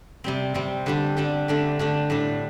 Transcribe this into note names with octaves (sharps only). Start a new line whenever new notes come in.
C3 G3 C4
C3 G3 C4
D3 G3 D4 G4
D3 G3 D4 G4
D3 A3 D4 G4
D3 A3 D4 G4
A2 G3 D4